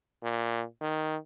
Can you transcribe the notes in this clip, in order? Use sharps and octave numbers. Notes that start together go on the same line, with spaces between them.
A#2
D#3